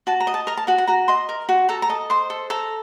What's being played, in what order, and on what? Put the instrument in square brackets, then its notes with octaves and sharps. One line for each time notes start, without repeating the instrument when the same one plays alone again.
[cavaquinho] F#4 A5
A#5
D#5
A5
A#4 A#5
A5
F#4 F#5
F#5
F#4 A#5
D#5 C6
A#4
F#4
A4 A#5
A#5
D#5 A5
C5 C6
A4
A4 A#5